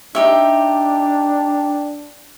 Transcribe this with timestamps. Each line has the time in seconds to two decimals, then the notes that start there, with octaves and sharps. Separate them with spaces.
0.15 D4 D#4 G4 E5